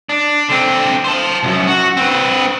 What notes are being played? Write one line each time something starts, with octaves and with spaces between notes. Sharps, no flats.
D4
D3 C4
C5 A5
C2 F#2
F#4
C4 B4